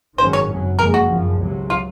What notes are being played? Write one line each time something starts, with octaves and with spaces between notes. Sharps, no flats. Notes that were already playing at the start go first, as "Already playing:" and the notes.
G#1 G#2 D#3 F#3 C#4 C5
C#5
F#2 C#3 F#3
F#1 F2 C#3 G#3 A#4
F#4
G#1 F#2 F3
C#2 C3 F#3
F4